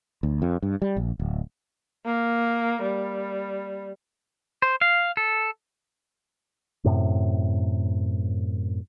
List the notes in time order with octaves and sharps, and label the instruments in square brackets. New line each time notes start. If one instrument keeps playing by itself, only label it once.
[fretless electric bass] D2
F2
G2
G3
A#1
D1
[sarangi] A#3
G3
[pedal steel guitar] C5
F5
A4
[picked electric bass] F#2 A2 C3